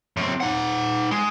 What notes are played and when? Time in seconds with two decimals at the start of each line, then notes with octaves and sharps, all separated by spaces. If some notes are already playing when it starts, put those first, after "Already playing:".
0.17 F#2 C4
0.40 D#4 F#5
1.11 G#3